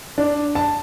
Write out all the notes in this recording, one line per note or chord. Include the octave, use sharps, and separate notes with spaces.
D4
A5